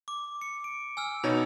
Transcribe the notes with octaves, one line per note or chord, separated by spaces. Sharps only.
D6
C#7
D7
G#5 E6 F6
B2 D#4 C#5 B5 A6